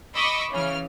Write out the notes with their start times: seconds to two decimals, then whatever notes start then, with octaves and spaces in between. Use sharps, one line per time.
0.15 D#5 B5 C#6 D6 E6
0.52 C#3 E3 F6